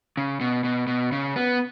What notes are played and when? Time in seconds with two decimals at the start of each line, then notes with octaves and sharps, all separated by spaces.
0.17 C#3
0.41 B2
0.64 B2
0.87 B2
1.12 C#3
1.36 B3